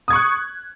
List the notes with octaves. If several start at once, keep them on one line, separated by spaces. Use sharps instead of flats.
C#6 D#6 F#6 G#6